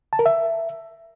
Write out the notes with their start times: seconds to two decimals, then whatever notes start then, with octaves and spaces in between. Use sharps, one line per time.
0.13 A5
0.19 A#4
0.26 E5